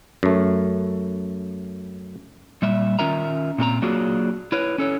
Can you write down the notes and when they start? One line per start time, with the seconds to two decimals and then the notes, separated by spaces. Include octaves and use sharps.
0.23 F#2 A3
2.62 A#2 G3 E5
2.99 D#3 C#4 F4 A#4 E5 A#5
3.58 A#2 C4 A4 A#5
3.82 F#3 A#3 D4 F4 F#4 G#4
4.52 E4 B4 C#5
4.78 C#4 A4 C#5